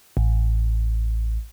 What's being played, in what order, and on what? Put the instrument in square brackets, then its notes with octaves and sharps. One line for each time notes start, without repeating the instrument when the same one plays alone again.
[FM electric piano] A1